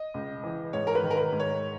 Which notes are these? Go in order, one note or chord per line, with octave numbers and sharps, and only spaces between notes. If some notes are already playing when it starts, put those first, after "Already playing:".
Already playing: D#5
C#2
E3
G#2 C#5
A#4
B4
D#3
A#4
B4
G#2
C#5